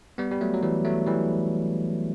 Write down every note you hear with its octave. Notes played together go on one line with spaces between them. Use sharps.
G3 B3
G3
F#3 A3
F#3
E3 G3
F#3 A3
E3 G3